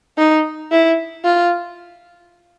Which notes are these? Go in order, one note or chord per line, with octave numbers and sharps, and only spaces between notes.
D#4
E4
F4